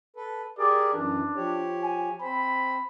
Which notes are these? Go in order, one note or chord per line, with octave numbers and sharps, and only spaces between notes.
A4 B4
G4 G#4 A#4 D5
F#2 E3 D4
F3 G4 C#5
G#5
C4 C5 B5